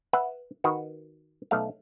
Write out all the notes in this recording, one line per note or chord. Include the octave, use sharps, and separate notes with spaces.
B4 E5 F#5
D#3 F#4 B4
B1 A3 F5